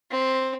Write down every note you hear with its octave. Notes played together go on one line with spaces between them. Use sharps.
C4